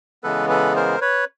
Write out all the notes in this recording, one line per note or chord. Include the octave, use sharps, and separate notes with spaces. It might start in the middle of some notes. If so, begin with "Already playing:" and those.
C#3 E3 G#3 B3 A4 B4
A4 B4
A#4 C5
B4 C#5